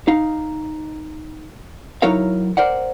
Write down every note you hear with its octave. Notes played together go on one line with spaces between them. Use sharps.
D#4 F5
F#3 D#4 E4 A#4 C#5 F5
A#4 C5 D5 F#5